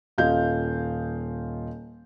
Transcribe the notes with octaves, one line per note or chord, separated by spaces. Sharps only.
D#1 F4 D#5 F5 G6